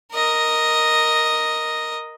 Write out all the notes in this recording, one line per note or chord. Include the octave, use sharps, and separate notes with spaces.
A#4 D#5